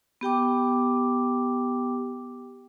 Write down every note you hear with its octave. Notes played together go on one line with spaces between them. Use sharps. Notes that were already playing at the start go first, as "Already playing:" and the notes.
B3 G4 G5 D6